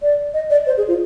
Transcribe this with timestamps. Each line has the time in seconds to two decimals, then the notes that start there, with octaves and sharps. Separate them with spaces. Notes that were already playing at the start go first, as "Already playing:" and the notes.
0.02 D5
0.34 D#5
0.50 D5
0.67 C5
0.77 G#4
0.88 F4